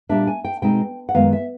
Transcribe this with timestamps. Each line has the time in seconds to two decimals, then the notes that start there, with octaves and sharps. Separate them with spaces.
0.09 A#2 G3 A#3 D4 E5
0.27 G#5
0.45 G5
0.62 B2 G#3 C4 D#4 G5
1.09 F#5
1.15 F#2 D#3 G#3 B3 F5
1.33 E5